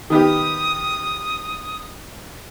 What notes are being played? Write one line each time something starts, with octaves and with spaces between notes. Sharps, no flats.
D#3 B3 G4 D#6